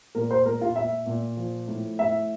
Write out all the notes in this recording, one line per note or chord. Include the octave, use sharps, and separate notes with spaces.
A#2 A#4
C5
A#2 A#4
F4
A#2 E5
A#2
F3
A2
A2 E5